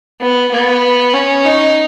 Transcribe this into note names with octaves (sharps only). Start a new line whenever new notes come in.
B3
B3
C#4
D#4